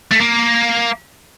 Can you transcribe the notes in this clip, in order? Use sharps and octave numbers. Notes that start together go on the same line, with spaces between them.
A3
A#3